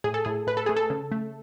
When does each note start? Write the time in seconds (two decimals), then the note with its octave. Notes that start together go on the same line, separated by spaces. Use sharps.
0.04 A2 G#4
0.14 A4
0.25 A2 G#4
0.47 A2 B4
0.57 A4
0.66 A3 G#4
0.76 A4
0.90 C#3
1.12 A3